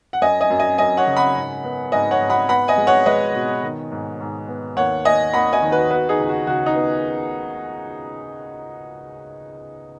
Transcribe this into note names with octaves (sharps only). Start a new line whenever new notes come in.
F#5
F#2 D#5 G#5
D#5 G#5
F#2
D#5 G#5
F#2 D#5 G#5
C#5 F#5
C#3
F#5 B5
G#2
B3
G#2 D#5 G#5
C#5 F#5
G#2
F#5 B5
B3 F#5 B5
D#5 G#5
G#3
C#5 F#5
G#3 B4 D#5
B2
D#3
G#2
G#2
B3
D#2 C#5 F#5
D#2 D#5 G#5
D#2 F#5 B5
D#5 G#5
D#3
F#4 B4
B3 F#4 B4
D#4 G#4
C#2
F#4
C#3 F#4
D#4
B3